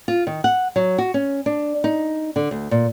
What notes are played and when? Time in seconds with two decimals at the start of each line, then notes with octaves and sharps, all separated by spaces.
0.08 F4
0.27 D#3
0.44 F#5
0.76 F#3
0.98 F#4
1.14 C#4
1.46 D4
1.84 D#4
2.36 D3
2.51 D2
2.71 A#2